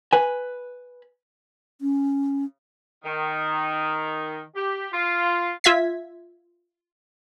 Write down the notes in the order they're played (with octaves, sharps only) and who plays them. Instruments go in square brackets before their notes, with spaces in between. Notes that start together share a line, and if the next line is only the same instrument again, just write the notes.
[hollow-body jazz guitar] B4 G#5
[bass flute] C#4
[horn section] D#3
G4
F4
[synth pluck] F4 E5 G#6 B6